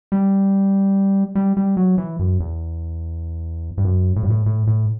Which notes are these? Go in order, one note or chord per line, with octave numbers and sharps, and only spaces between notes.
G3
G3
G3
F#3
E3
F#2
E2
G2
F#2
A2
G2
A2
A2
A2